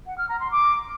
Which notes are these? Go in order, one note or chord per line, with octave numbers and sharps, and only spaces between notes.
F#5
F6
A#5
C6
D6